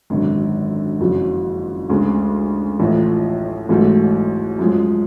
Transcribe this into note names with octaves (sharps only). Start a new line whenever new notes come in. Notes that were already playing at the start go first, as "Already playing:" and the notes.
G#1 F#2 D3
F#1 F2 C#3 F#3
D2 C#3 G#3
A1 A2 F3
A1 G#2 F#3 A3
F#2 F3 G#3